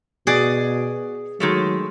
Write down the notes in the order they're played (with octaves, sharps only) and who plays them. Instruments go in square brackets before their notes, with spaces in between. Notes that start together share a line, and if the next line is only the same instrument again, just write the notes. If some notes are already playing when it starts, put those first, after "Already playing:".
[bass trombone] B2 [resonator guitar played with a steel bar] F#4 D5 D#5 [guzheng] G#4
[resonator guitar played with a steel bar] D#3 G#3 A3 [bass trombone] F#3